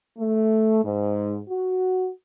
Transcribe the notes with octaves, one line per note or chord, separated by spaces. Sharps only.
A3
G#2
F#4